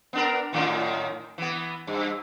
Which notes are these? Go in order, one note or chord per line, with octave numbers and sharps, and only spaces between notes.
B3 D4 A#4
F#2 A2 D#3
E3 B3
G2